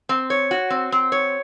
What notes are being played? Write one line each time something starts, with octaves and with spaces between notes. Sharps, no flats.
C4
C#5
F#4
C4
C4
C#5